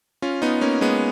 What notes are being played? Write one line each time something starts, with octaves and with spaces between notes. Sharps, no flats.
C#4 F4
B3 D#4
A#3 C#4
G#3 B3